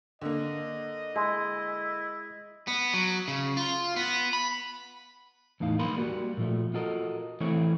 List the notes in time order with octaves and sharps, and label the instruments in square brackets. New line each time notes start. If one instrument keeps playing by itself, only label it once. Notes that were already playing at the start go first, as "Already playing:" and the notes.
[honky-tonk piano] D3 A#3 [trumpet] D#5
[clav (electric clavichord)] G#3 [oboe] E4
[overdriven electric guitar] B3
F#3
C#3
F4
B3
B5
[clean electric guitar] E2 A2 D#4 F5
B1 A#3 A#4 B4 B5 C6
G3 A#3 F#4
A#2 F3 A3
F4 F#4 A4 A#4 D#5
E3 A3 C4 C#5